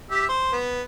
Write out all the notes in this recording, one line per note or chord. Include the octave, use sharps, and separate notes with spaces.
G4 E5
C5
B3